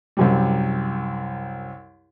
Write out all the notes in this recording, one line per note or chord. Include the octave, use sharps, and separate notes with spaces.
C2 F#2 G3